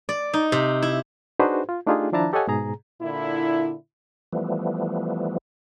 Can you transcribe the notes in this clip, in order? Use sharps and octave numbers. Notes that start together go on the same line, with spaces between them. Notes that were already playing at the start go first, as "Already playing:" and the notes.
D5
D#4
C3
E4
D4 D#4 F#4 G#4 B4 C5
F4
A3 D4 D#4 F4 G4 G#4
D#3 F3 D4 E4 A5 A#5
G4 A4 C#5 D#5 F#5 G#5
G#2 B2 G#4 A#5
A#2 D3 E4
E3 F3 G3 A3 B3